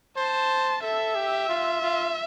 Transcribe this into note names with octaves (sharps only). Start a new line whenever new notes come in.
C5 A5
A4 E5
G4
F4
F4